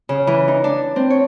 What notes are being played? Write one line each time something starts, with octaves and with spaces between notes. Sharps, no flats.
C#3
E3
D#4
D4
C4
C#5